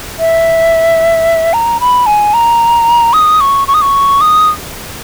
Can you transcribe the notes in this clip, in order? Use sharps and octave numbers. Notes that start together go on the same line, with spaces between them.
E5
A#5
B5
G#5
A#5
D#6
C#6
C#6
D#6
C#6
D#6